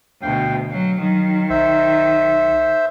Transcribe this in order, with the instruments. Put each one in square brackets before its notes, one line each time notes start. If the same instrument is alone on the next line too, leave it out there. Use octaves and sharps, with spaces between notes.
[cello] D2 B2 [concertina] F5 G5
[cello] F#3 [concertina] F5
[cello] D#3 [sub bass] F#3
[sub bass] B1 [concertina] C5 E5